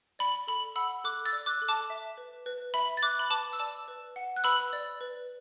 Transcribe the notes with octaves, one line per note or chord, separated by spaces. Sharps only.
D5 B5
A4 B5
F#5 B5 E6
A4 D6 F#6
E6 A6
D5
D6 F#6
A4
A5 D6
E5
B4
B4
E5 B5
A6
E5 D6 F#6
B5
B4 A5 D6
E6
D5 A5 D6
B4
F#5
F#6
B4 B5 E6
D5
B4